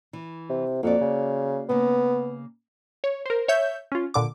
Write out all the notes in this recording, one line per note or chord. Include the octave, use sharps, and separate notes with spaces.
E3
C3
F2 A#3 F#4 D5
C#3
C#3 A#3 B3
C#5
A#4 C5
C#5 E5 G6
C#4 F4
A#2 D3 D6